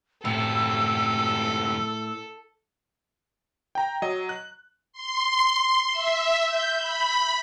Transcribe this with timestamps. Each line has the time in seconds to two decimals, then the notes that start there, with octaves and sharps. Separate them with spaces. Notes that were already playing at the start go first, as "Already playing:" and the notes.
0.25 F#2 A2 C3 A4 E6
3.75 G5 A#5
4.02 F#3 D#5
4.29 F#6
4.93 C6
5.91 E5
6.46 G6
6.78 B5